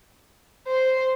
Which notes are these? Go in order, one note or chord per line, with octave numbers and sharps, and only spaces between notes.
C5